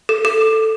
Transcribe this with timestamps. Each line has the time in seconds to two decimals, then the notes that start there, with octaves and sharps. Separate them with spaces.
0.09 A4
0.25 A4